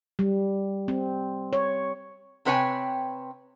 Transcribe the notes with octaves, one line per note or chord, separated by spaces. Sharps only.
G3
C4
C#5
C3 C4 B4 C#5 G5 G#5